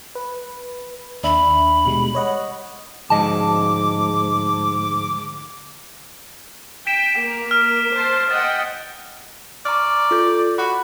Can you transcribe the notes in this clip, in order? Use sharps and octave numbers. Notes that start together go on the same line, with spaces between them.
B4
D#2 D4 E5 B5
B2 G3 G#3
C#5 D#5 F#5
D2 G#2 F3 D#5 A5 D6
G5 B6 D7 E7
A#3 A#4
F6
C5 A5 C6
D#5 F#5 G5 A6
D5 A#5 C#6 F6
F4 A4 G6
F#4 B5